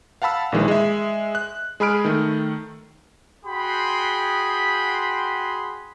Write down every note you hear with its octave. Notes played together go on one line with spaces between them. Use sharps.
F5 F#5 A5 B5 E6
A#1 D#3 E3 G#3
G#3 E5
F#6
G#3 G#4 B5 F6 D7
D#3 A3
F#4 G#4 G5 B5 C6